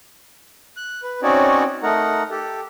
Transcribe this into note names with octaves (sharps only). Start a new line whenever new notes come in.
F#6
B4
C4 C#4 D#4 F#4 C#5 D5
A3 D#4 A#4 F#5
G4 A4